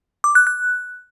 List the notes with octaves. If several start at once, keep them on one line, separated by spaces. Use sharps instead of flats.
D6
F#6
F#6